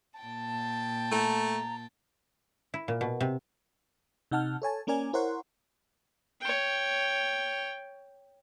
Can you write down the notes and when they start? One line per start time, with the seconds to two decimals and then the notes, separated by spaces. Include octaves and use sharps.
0.20 A#2 G5 A5
1.11 A3 A#5
2.74 E4
2.88 A#2
3.01 B2
3.20 C3
4.31 C3 D#4 F#5 A5 F6
4.62 A4 C#5 G#5 A5
4.87 A#3 C#4 A#4 D5 G#5
5.13 E4 A#4 C5 C#5 F#5 C6
6.41 C#5 G5